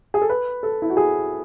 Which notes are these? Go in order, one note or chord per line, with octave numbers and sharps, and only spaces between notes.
G#4
A4
B4
A4
E4
F#4
G#4